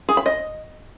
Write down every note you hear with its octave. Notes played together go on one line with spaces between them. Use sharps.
G#4
B5
D#5